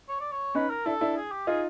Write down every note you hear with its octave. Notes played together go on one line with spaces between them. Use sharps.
C#5
D5
C#5
C#4 D#4 B4
A#4
D4 E4 A4
D4 E4
G#4
G4
D#4 F4 G#4